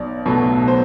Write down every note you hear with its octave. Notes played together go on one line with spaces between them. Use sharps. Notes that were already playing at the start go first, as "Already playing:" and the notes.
Already playing: B1 D5
B2 F#3 A3
C5